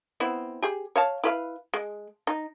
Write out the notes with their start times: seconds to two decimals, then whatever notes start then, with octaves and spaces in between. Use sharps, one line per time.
0.20 B3 C4 E4
0.62 G4 G#4
0.96 C#5 F5 A5
1.24 E4 B4 F5
1.74 G#3
2.27 D#4